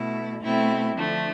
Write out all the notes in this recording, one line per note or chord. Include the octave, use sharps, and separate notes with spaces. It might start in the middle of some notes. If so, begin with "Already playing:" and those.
Already playing: B2 A3 E4
B2 A3 C4 E4
D3 F3 A3 D4